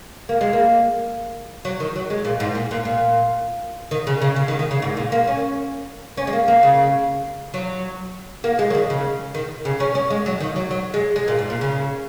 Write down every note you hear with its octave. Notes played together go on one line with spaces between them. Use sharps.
A#3
G#3
A#3
F#3
D#3
F#3
G#3
A#2
G#2
A#2
A#2
A#2
D#3
C#3
C#3
C#3
D#3
D#3
C#3
G#2
A#2
A#3
C#4
C#4
G#3
A#3
A#3
C#3
F#3
A#3
G#3
F#3
D#3
C#3
D#3
C#3
C#4
C#4
G#3
F#3
D#3
F#3
F#3
G#3
G#3
A#2
G#2
A#2
C#3